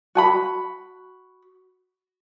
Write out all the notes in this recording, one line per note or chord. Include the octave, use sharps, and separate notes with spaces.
F#4 G#5 B5